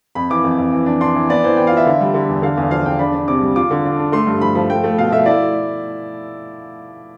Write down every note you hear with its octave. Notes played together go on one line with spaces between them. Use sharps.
F2 B5
E3 D6
F2
F2
E3
D4
D4 C6
E3
B3 D5
E3 C5
B3 G5
F4 F5
E5
D3
G3
D3
E2
D3 F5
E2
F3 F5
E2 G5
D4 B5
D4
C3 D6
G3
F4 D6
D3
D4
D4
A3 C6
G2
F3 B5
F3 B5
A3 G5
A3
B2 F5
A3 E5
E4 D5